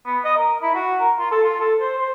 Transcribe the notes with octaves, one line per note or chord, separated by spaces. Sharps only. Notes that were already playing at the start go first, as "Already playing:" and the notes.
B3
D#5
A#4
E4
F#4
A#4
F4
A4
F4
A4
C5
C5